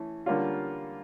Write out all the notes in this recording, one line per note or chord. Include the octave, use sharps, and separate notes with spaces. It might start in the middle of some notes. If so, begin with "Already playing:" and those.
Already playing: E3 A3 C#4
D3 G3 A#3 C#4 F4